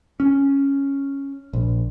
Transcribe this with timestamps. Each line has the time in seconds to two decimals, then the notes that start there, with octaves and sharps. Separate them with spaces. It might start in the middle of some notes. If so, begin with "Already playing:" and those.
0.20 C#4
1.53 A#1